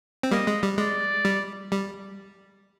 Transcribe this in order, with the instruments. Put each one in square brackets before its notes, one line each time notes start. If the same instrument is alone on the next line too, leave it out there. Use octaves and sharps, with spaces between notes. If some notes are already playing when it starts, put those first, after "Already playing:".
[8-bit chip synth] C4
[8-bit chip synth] G3 A#3 [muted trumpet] D#5
[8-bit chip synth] G#3
G3
[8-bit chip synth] G#3 [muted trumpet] D5
[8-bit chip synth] G3
G3